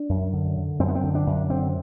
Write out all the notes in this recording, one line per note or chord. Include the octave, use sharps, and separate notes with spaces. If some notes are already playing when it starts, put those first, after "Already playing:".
Already playing: D4
F#2
D3
D3
F#2 C4
B3
C4
D3
D4
F#2
D3 C4